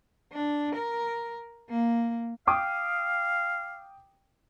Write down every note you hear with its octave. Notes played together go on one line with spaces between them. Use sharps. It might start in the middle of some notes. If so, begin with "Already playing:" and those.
D4
A#4
A#3
F5 G5 D6 D#6